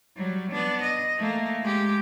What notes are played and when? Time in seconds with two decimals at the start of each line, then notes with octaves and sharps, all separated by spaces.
0.16 F#3 G3
0.52 B3 D4
0.82 D#5
1.18 A3 A#3
1.62 G#3 G4